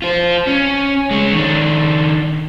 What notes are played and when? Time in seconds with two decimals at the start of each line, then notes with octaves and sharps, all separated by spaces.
0.02 F4 C5
0.47 C#4
1.11 G#3 C#5
1.33 D#3 D4